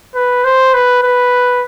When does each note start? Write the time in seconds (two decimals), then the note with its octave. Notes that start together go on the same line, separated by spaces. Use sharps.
0.15 B4
0.44 C5
0.74 B4
1.03 B4